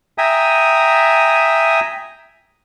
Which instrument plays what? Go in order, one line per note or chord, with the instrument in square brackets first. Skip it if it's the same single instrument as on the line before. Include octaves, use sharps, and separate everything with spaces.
[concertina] E5 G5 G#5 A#5 D#6